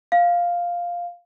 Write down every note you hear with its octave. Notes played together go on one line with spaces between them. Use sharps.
F5